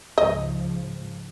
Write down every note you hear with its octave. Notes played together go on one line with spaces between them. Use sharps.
C#2 G#2 F3 D#5